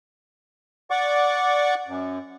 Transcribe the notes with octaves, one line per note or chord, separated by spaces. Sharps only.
D5 F#5 C#6 D6
F#2